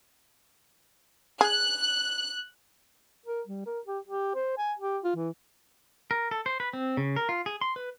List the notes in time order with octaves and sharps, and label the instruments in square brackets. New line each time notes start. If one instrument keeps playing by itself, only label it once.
[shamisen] G#4 [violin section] F#6
[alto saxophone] A#4
G3
A#4
G4
G4
C5
G#5
G4
F4
E3
[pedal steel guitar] A#4
A4
C5
B4
C4
C#3
A#4
F4
G#4
C6
B4